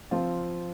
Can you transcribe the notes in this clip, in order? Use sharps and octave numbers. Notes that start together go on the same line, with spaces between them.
F3 C4 F4